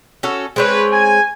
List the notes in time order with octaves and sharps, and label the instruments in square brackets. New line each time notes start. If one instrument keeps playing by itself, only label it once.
[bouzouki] C#4 F#4 A4
[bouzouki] G#3 C4 C#5 [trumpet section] B4
[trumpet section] G#5